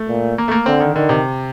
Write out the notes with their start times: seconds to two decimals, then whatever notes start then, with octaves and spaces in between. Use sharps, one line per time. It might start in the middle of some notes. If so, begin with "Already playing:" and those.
Already playing: A3
0.08 A#2
0.38 A#3
0.48 A3
0.51 A#3
0.66 D3 C4
0.80 D#3
0.95 D3 D#3
1.09 C3